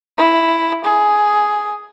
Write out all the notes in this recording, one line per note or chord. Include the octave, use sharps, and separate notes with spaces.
E4
G#4